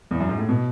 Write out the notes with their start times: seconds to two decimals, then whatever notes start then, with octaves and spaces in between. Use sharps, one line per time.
0.11 E2
0.20 F#2
0.29 G#2
0.38 A2
0.49 B2